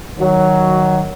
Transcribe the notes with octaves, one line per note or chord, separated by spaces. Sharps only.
D#3 F#3